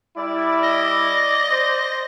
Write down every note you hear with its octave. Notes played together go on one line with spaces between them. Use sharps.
G3 E4 D5
D#5
C5